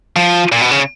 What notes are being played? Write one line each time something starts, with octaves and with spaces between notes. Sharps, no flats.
F3
A#2
B2
C#3